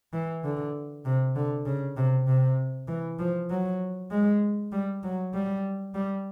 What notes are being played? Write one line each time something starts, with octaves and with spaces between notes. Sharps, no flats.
E3
D3
C3
D3
C#3
C3
C3
E3
F3
F#3
G#3
G3
F#3
G3
G3